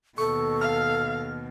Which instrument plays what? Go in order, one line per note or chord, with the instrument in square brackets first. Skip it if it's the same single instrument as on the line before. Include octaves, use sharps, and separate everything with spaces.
[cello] D#2 B2 [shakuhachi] A4 [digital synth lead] C#6
[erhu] F5 [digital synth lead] F6